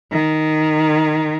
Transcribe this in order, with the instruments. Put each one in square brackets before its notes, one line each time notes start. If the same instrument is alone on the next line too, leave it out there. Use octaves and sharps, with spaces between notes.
[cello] D#3